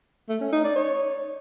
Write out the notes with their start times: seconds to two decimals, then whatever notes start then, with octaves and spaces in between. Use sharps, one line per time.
0.29 A3
0.41 C#4
0.52 D#4
0.64 D5
0.76 C#5